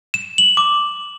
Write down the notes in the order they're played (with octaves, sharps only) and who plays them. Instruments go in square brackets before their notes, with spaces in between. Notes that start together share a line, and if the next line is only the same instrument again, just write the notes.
[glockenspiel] E7
F#7
D6